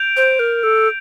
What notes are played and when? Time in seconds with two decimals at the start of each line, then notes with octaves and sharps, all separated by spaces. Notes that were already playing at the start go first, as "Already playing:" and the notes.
Already playing: G6 D7 F7
0.17 C5
0.39 A#4
0.63 A4